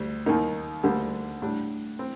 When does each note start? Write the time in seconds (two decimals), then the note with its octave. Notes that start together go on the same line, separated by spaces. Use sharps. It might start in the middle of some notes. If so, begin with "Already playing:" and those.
Already playing: D2 G3
0.26 D#2 D#3 A#3 D#4
0.83 D2 D3 G3 A#3
1.42 A2 G3 D4
1.99 C4